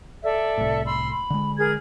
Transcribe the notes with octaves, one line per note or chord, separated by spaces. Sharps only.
A4 D5 E5
C2 A2
B5 C6 E6
B5
D3 G#3
G#4 A#4 G#6